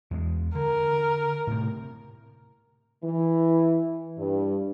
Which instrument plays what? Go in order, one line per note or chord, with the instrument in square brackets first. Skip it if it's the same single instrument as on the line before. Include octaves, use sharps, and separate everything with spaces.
[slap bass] E2 G3 G#3
[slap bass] D3 [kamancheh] A#4
[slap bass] A2 C3
[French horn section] E3
G2